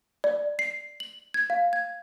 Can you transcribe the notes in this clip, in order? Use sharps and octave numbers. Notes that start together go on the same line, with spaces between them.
D5
C7
F#7
G#6
F5
G#6